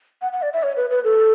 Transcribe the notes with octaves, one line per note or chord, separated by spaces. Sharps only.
F#5
F#5
D5
E5
C#5
B4
B4
A4